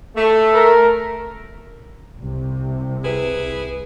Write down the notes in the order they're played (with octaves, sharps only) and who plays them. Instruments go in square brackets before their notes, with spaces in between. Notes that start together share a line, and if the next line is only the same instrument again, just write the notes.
[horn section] A3
[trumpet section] A#4
[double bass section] C2 C3
[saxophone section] E4 G#4 B4